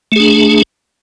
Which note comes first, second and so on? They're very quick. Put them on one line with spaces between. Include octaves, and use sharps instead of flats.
A3 G#4 D4